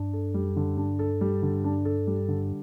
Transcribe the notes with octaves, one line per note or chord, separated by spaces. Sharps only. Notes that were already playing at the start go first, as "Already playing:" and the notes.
Already playing: G2 D4
A4
F#2 G3
D3
G2 D4
A4
G3
D3
D4
A4
G3
D3